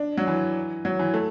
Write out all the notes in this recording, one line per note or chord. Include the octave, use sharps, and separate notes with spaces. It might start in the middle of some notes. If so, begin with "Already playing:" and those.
Already playing: D4
F#3
E3
F#3
E3
A3